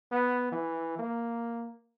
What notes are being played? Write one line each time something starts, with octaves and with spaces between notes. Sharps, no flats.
B3
E3
A#3